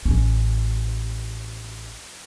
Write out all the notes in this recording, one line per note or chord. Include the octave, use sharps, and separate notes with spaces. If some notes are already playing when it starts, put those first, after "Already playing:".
A1 C#4